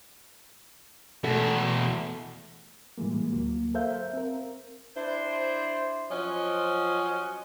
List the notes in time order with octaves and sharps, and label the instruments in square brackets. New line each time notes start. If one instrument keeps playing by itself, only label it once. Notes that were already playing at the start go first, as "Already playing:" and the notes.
[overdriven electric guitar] E2 B2 [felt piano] A3 A4
[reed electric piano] A2 E3 G3 G#3 A#3
D2 F#3 A#3
A4 A#4 C5 E5 F5 G6
C4 A#4
[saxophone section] D4 E4 C5
F3 F#3 C#4 C5 D#5